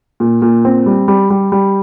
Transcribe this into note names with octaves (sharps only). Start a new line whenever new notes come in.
A#2
A#2
C4
G3
G3
G3
G3